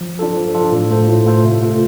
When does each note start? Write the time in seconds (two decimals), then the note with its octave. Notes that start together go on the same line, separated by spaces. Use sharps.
0.01 F3
0.19 D4 F4 A4
0.37 F3
0.54 D4 F4 A4
0.72 A2
0.91 A3 F4 A4 C5
1.08 A2
1.26 A3 F4 A4 C5
1.44 C3
1.61 A3 F4 A4